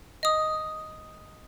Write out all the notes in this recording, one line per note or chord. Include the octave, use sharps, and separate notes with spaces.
D#5 D#6